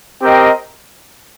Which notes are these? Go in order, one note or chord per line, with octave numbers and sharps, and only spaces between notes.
C4 G4 A#4 D#5 G5